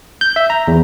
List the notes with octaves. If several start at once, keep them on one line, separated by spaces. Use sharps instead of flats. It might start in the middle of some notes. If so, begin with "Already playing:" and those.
G6
E5
A#5
E2